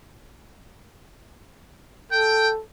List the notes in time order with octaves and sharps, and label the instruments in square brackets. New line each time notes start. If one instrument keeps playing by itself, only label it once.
[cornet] A4 [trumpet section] G5